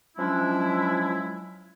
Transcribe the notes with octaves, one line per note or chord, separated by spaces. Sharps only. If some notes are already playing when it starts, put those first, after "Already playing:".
F3 F#3 G#3 C#4 D4 E4